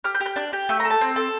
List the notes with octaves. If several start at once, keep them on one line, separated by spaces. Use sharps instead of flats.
G4 F6
G6
G4
G6
D4 F#6
G4
A3 E6
A#5
A4
A5
C4
A4